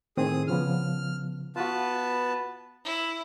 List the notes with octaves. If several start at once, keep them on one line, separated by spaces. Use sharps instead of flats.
A2 D#3 C4 G#4 D#6
C#3 F3 B3 F6
B3 F4 F#4 B4 A5
E4